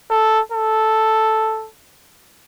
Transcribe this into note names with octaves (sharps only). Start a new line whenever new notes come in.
A4
A4